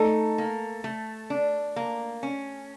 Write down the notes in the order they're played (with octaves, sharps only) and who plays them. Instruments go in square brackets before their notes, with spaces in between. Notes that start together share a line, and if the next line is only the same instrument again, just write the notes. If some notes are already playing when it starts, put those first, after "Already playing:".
Already playing: [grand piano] A3 A4 [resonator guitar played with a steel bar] D#4
[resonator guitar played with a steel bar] A#3
A3
D4
A#3
C#4